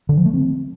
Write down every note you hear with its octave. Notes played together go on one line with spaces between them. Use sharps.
D3
F3
A3
C4